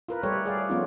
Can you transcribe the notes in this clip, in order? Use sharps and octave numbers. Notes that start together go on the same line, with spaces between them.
F4 A#4 B4
G3 A3 G4 A4 B4 C#5
G#4 D5 F5
F3 A3 B3 C#4 D#4 F4